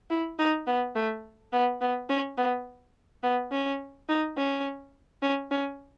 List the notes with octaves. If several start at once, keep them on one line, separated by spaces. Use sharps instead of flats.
E4
D#4
B3
A3
B3
B3
C#4
B3
B3
C#4
D#4
C#4
C#4
C#4